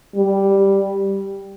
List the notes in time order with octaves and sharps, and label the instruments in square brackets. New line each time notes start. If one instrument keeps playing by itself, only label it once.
[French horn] G3